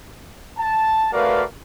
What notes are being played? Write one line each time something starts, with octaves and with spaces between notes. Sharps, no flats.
A5
A3 F#4 A#4 B4 D5 F5